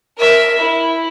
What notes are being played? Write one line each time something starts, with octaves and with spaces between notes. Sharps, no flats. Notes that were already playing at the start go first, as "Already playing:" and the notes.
A#4 E5
E4